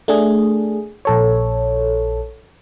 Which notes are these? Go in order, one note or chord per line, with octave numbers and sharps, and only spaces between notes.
A3 D4 G#4
A#1 A4 C#5